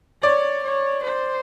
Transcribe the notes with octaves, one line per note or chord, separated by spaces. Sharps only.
C#5 D5
C#5
C5